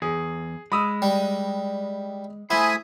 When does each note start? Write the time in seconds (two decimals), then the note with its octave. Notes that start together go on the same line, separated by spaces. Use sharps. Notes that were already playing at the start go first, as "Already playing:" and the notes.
0.02 E2 G#4
0.72 G#3 B5 D#6 E6
1.02 G3
2.50 A3 E4 C5 G#5 B5 D#6